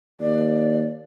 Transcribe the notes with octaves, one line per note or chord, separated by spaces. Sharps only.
D#2 D5